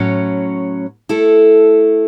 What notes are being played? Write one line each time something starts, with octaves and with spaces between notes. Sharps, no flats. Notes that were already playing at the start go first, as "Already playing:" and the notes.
Already playing: A2 F#3 C#4
A3 E4 A4